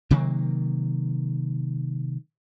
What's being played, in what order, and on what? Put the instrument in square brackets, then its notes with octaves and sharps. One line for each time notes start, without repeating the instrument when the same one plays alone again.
[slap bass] C3 D#3 F#3 A#3